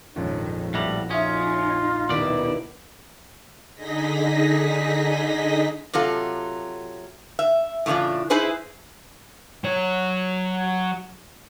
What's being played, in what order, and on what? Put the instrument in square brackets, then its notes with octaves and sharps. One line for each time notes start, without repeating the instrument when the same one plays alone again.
[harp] A#1 F2 [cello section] G#2 D#3 C#4
[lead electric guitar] A2 G3 [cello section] B3 [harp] E4 F#4 A#6
[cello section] F2 D#4 [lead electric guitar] C#4 [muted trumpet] F4 [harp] E5 D#6
[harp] D#1 B4 D#5 [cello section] D#2 D#4 E4 [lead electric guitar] B2 D5
[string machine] D3 D#4 G#4 D#5 A#6 B6
[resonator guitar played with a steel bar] C3 F#3 F4 A4
E5
A2 C#3 E3 D4 F4
D#4 E4 G#4 B4 C5
[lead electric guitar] F#3 C#5